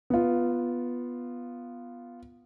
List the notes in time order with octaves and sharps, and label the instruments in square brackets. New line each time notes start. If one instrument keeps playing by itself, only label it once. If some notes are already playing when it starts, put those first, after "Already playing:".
[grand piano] B3 F4